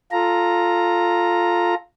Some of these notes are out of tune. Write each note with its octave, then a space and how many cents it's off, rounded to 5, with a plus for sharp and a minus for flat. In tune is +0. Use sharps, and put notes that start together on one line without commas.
F4 +0 A4 +0 A#5 +0